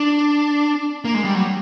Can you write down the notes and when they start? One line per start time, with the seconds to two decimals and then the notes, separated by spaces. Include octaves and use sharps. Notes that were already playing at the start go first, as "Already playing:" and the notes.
Already playing: D4
1.05 A#3
1.15 G#3
1.24 G3
1.34 F#3